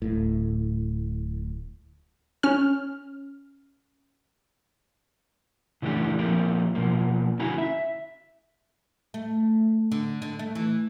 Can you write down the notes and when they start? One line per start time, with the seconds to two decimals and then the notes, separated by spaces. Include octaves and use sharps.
0.02 D1 A2
2.43 C#4 F6
5.82 C#3 E3 A3 D4 G4
6.19 F3 A#3 C4 G4
6.75 B2 F3 A#3
7.40 D3 C#4 E4 F#4 G#5 A#5
7.58 E5
9.14 A3
9.92 D3
10.22 D3
10.39 A3
10.55 E3